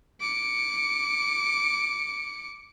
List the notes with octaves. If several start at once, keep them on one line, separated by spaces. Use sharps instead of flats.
D6 C#7